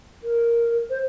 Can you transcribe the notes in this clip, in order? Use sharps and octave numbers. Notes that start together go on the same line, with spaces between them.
A#4
C5